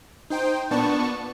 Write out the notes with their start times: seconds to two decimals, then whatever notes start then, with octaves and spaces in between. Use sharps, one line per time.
0.30 D#4 C5 G5
0.71 A#2 B3 D4 A5 C#6